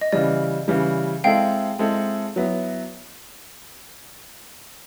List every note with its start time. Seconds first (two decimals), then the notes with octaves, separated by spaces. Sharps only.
0.01 D#5
0.12 C#3 E3 G3 D5
0.68 C#3 E3 G3
1.24 G#3 C4 E4 A4 F5 G5
1.79 G#3 C4 E4 A4
2.36 F#3 B3 E4